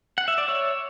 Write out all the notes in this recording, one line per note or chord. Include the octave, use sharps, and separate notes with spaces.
F#5
E5
D5
C#5 E5